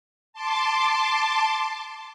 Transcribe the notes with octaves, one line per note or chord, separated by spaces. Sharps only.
A5 C6 D6